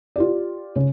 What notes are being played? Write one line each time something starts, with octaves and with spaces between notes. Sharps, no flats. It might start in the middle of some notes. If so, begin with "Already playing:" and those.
F4 G4 D5
C#3